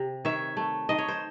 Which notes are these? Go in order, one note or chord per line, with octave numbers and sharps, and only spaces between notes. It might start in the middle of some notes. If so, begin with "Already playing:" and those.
Already playing: C3
D#3 C#5 E5
A3
D#3 D#5
C#5
C5